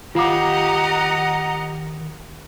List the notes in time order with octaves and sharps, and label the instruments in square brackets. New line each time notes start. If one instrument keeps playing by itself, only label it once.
[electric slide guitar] D#3 F5 [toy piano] F4 D6 [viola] G4 D#5 [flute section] F#5 A#5